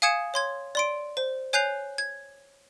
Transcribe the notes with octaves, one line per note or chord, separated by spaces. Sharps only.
F5 G#5 D#6 G#6 C#7 E7
C#5 C6 G#6
D5 C6 D7
C5
C#5 G#5 F#6 G6 C7 F7
G#6